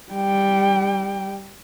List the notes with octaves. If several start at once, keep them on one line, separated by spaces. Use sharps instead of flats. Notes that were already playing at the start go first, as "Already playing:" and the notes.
G3 G5